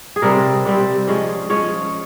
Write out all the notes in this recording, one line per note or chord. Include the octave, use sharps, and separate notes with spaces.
G#4
C3 G3 C4 A#4
C3 G3 C4
F3 G#3 C#4
F3 G#3 C#4 C#5